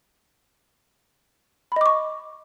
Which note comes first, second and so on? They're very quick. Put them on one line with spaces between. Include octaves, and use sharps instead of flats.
B5 D#5 D6 C#6